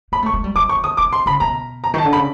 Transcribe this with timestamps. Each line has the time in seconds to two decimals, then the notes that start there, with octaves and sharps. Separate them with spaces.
0.12 A#3 B5
0.22 A3
0.26 C#6
0.34 G#3
0.44 G3
0.56 F3 D6
0.69 C#6
0.76 D#3
0.84 D#6
0.97 D#3 D6
1.13 C6
1.26 C#3 B5
1.40 B2 A#5
1.84 A#5
1.94 D#3 A5
2.05 D3
2.13 B5
2.16 C#3